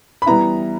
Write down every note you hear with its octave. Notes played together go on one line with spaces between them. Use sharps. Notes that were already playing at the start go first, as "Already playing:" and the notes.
B5
E3 G3 B3 E4 A#5